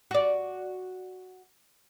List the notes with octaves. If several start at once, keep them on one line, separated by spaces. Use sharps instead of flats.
F#4 D5